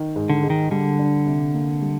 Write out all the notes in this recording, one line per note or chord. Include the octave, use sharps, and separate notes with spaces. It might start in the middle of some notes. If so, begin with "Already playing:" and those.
Already playing: D#3
G#2
D3
G#3
D#3
D3 G3
D4
C3
A#3
G3